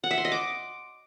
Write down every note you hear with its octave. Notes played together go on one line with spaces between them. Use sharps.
F#5
E5
C6
D#5
D6